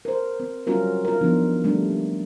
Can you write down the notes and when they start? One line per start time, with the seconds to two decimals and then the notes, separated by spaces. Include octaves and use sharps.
0.05 A#4 C5
0.40 C4
0.67 F#3 G3 C#4 F4 F#4 A#4
1.05 F4 A#4
1.21 F3 B3 D4 D#4
1.64 G3 A3 A#3 D4